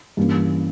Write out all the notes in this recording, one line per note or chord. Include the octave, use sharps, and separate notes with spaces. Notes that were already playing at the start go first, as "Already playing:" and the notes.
G2 E3 A#3 C#4